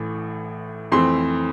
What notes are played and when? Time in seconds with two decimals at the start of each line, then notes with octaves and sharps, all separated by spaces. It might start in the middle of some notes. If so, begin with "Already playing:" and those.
Already playing: A1 A2 E3 A3
0.92 F2 E3 A3 C4 C6